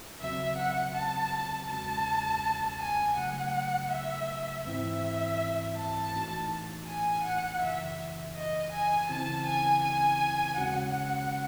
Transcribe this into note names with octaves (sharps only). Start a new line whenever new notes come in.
D#2 C#3 F#3 C4 F#4 E5
F#5
A5
E2 C#3 G#3 C#4 F#4 A5
G#5
C#3 F#3 A3 F#5
E5
G#2 E3 C4 E4 E5
A5
A2 E3 A3 D#4 F#4
G#5
F#5
F#2 C#3 E3 E5
D#5
G#5
C#3 E3 C4 E4 A5
G#5
G#5
D#2 C#3 G#3 C#4 F#4 F#5